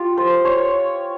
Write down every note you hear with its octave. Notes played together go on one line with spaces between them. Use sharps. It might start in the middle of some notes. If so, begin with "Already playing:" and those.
Already playing: F4 G4
C5
C#5